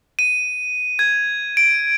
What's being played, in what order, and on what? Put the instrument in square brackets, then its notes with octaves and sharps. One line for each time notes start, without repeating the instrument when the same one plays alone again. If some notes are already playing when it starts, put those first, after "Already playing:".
[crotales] D#7
G#6
D7